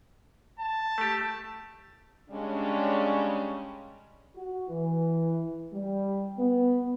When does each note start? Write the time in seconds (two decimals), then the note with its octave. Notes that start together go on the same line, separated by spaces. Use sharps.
0.59 A5
0.98 A3 G4
2.30 C#3 G3 G#3 C#4 D4
4.36 F#4
4.68 E3
5.73 G3
6.38 B3